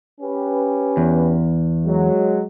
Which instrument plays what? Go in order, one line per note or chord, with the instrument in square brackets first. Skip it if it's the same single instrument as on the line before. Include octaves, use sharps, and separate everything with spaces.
[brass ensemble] C#4 G4 B4
[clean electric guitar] E2
[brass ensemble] F#3 G#3